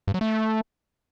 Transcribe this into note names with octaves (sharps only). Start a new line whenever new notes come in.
G2
F#3
A3